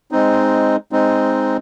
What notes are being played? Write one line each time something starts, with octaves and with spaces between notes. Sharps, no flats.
G#3 C4 D#4
G#3 C4 D#4